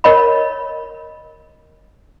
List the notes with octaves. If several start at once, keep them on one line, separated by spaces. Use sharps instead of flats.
A#4 C#5 D#5 B5